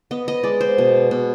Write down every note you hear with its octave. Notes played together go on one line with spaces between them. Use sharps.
B3 D#5
D#5
G#3 D5
C5
B2
B2